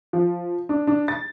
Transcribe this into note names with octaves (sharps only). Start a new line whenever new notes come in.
F3
D4
D4
A6